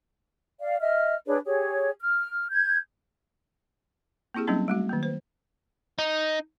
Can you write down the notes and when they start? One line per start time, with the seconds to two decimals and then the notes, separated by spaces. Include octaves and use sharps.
0.60 D5 F5
0.79 D#5 E5 F6
1.26 D4 G#4 B4 C#5
1.45 G4 G#4 C#5
1.99 F6
2.50 G6 G#6
4.34 A#3 C4 E4 G4 G#4
4.47 F#3 G3 A#3 C4 C#4 D#4
4.68 G3 A3 F#4
4.89 D#3 F#3 A#3
5.03 B4 C5
5.99 D#4